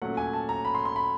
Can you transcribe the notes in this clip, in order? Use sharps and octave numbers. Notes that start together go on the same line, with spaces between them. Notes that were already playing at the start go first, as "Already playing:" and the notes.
A#2 F#3 A3 C#4 F#5
G#5
A5
A#5
B5
C6
C6
B5